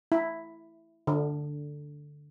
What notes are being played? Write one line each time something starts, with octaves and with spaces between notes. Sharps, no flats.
E4
D3